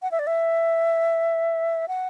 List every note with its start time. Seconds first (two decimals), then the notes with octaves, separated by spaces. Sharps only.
0.02 F#5
0.11 E5
0.19 D5
0.27 E5
1.88 F#5